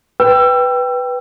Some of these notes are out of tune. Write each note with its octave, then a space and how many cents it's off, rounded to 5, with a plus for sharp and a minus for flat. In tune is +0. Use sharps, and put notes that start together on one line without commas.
B4 +0 G5 +0 E6 +30